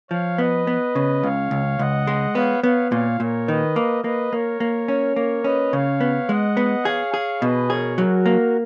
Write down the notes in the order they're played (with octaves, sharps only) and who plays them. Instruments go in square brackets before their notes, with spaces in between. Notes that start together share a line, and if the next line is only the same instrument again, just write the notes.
[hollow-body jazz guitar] F3 [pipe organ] C#5 F5
[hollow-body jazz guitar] B3 [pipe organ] B4 D#5
[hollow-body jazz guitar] B3
C#3
[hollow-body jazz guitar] C#2 [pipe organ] C#5 F5
[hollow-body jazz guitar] C#2
[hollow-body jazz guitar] C#2 [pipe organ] D#5 F#5
[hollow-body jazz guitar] G#3
[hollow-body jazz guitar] B3 [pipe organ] C#5 F5
[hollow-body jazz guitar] B3 [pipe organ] C#5 F5
[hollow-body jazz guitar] A#2 [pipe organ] C#5 F5
[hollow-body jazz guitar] A#2 [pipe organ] A#4 C#5
[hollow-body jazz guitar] D#3 [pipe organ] B4 D#5
[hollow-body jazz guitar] A#3
[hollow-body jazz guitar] A#3 [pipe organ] B4 D#5
[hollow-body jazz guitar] A#3 [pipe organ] A#4 C#5
[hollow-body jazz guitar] A#3
C#4
[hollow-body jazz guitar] A#3 [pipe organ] A#4 C#5
[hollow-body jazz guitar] C#4 [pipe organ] B4 D#5
[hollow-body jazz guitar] C#3 [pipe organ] C#5 F5
[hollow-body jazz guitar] B3
[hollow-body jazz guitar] G#3 [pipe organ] D#5 F#5
[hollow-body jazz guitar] B3
[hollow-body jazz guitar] G#4 [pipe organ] C#5 F5
[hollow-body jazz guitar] G#4
[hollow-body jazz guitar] B2 [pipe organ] B4 D#5
[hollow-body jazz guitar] G#4 [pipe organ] A#4 C#5
[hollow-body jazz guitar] F#3 [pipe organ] F#4 A#4
[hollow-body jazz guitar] A#3